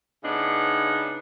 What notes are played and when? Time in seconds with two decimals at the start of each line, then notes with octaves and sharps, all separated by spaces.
0.23 A2 C#3 B3 D4 D#4